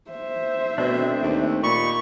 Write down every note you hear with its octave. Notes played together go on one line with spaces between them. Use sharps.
C5 E5
B2 A3 C4 D4
D#2
A#2 D#4 G4 B5 C#6